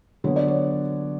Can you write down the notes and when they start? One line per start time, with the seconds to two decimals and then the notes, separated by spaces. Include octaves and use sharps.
0.24 D3 F#3 B3 C#5
0.36 D5
0.48 C#5